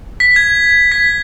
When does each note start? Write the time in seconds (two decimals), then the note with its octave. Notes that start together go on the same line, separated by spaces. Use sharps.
0.20 B6
0.36 G#6
0.92 B6